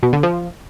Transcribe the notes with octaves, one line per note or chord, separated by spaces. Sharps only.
B2
D3
F3